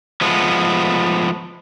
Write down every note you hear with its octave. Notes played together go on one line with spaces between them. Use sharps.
F3 G#3 A3 B3